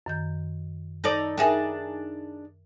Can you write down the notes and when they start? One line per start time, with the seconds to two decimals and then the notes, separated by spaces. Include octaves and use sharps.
0.06 F#2 D#3 G6
1.04 D#4 A4 D5
1.38 D4 D#4 G#4 A#4 E5 G5